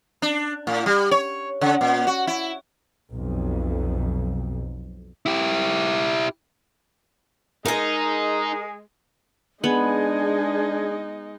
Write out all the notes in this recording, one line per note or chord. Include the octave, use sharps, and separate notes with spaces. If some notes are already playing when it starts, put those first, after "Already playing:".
D4
A2
G3
C#5
C#3
A#2
F#4
E4
B1 F2
E4 G4
G#3 D#4 G#4 A#4
G#3 B3 D4 D#4 G#4